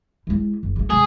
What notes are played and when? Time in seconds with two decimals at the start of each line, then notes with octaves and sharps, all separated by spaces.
0.27 G#3 E4
0.63 F#1
0.76 A2 G#3
0.90 C3 G#3 G#4